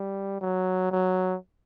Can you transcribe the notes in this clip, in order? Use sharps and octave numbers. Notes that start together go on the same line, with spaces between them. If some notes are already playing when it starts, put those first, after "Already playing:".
Already playing: G3
F#3
F#3